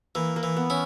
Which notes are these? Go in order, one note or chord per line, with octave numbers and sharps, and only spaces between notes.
E3 A#3
A#3
E3
B3
C#4 E4